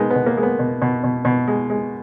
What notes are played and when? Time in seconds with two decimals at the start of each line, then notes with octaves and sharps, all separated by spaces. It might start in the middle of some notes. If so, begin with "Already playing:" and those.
Already playing: B2 G#3 A#3 B3 D#4
0.10 B2 B3
0.26 A#3
0.37 G#3
0.43 B3
0.59 B2
0.82 B2
1.04 B2
1.25 B2
1.47 G#3
1.70 G#3